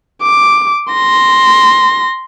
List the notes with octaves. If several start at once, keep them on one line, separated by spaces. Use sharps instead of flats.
D6
C6 A#6